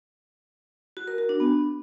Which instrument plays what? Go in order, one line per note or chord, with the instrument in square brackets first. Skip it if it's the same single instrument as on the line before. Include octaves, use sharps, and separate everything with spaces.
[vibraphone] F#4
A#4
F#4
D4
B3